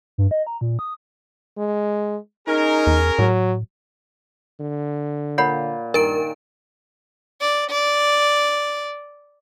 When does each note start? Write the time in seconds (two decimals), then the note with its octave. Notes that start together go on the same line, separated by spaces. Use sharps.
0.18 G2
0.31 D#5
0.47 A#5
0.61 A#2
0.79 D#6
1.58 G#3
2.48 C#4 D#4 G#4 A#4
2.87 E2
3.19 A2 F#3
4.60 D3
5.38 A#2 C#5 F#5 B5
5.94 G2 D#3 A#4 D7
7.41 D5
7.70 D5